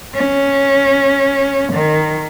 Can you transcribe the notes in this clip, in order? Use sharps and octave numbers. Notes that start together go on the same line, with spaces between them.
C#4
D#3